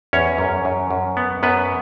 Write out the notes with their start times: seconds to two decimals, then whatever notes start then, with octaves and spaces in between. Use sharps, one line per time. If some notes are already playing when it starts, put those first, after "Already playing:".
0.13 E2 C#4 C#5
0.38 F#2
0.65 F#2
0.91 F#2
1.17 B3
1.43 F#2 B3 B4